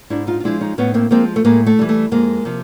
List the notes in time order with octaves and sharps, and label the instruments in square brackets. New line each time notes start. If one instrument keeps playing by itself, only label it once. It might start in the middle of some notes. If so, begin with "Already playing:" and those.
[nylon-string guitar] G#2 D4 E4
D#4 F4
F4
F3 G#3 D4 E4
C#4 D#4
A2 B3 C#4
A#3 C4
F3 G#3 A#3 C4
A3
A2 G#3 A#3
A3
E3 G3
A3
F2 G#3 A#3
C3 F3